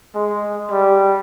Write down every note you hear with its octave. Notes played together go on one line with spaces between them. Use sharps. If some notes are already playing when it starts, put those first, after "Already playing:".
G#3
G3